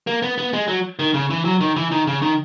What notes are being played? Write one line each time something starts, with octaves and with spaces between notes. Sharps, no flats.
A#3
B3
B3
G#3
F#3
D#3
C#3
E3
F#3
D#3
E3
D#3
C#3
D#3